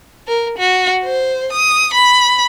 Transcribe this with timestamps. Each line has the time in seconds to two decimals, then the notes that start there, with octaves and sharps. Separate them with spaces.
0.28 A#4
0.59 F#4
1.04 C5
1.53 D#6
1.94 B5